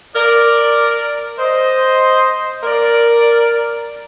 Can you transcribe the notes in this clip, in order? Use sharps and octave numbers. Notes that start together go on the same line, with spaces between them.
A#4 D5
C5 D#5
A#4 D5